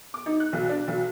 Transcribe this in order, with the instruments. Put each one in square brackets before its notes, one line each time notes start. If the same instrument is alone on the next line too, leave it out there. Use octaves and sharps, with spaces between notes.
[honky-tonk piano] D6
D#4
F#6
B1
D4
B1